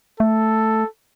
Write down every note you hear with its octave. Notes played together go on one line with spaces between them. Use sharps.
A3 A4